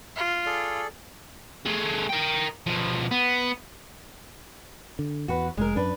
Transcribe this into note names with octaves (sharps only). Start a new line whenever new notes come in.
F4
G#4 A4 D5
A3 G#4
A#4 G5
B2 F3
B3
D3
E2 F#4 B4
F1 G#3 A#4
F#2 D4 B4